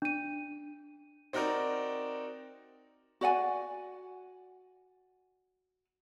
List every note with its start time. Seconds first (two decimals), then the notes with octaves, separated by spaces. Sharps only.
0.02 D4 D#7
1.33 C4 D#4 F#4 A#4 D5
3.21 F#4 D5 F#5 G#5